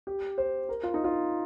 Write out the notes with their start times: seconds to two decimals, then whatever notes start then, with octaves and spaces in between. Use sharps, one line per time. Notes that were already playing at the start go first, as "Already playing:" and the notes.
0.07 G4
0.38 C5
0.69 A#4
0.83 F4
0.94 D#4
1.04 F4